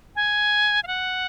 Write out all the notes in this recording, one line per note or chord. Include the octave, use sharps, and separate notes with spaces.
G#5
F5
F#5